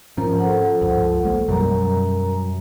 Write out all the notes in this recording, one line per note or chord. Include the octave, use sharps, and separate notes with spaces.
G#2 F3 C#4 A#4 A#5
A4 C5 F#5
C#2 G2
A#1 G#3 A#3
F#2 B2 F#3 G3 A#4 A#5